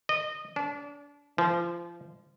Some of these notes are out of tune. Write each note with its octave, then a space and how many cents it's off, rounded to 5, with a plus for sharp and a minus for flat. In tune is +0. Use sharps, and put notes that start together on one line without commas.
D#5 -25
D4 -30
F3 -25